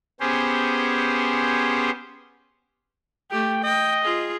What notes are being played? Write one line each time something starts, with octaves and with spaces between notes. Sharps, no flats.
B3 C#4 G4 G#4 C5
A3 G4 G5
D#5 G5
F4 G#4